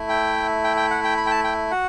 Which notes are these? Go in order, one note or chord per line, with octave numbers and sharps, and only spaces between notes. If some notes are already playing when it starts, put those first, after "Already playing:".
Already playing: A3 E4
G5
G5
G5
F#5
G5
B5
G5
A5
G5
F#4 F#5